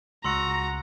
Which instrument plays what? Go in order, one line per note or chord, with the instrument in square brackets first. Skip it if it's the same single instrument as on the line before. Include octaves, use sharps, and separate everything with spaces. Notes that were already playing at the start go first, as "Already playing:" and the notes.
[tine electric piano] C#2 [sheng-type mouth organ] F#4 [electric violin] A#5 [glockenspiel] C6 E6 C#7